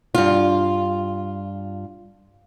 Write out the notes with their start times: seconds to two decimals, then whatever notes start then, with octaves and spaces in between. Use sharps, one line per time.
0.15 G2 F4